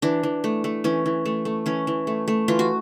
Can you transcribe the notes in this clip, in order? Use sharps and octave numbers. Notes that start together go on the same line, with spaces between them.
E3 D4
E3
A3
A3
E3 C#4
E3
A3
A3
E3 C#4
E3
A3
A3
E3 F4
F#4